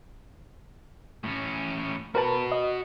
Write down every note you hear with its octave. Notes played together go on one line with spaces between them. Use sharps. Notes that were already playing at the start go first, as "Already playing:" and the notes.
A2 C#4
F#4 A#4 B4 A5 B5
D#5